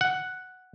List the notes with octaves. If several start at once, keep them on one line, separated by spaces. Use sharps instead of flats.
F#5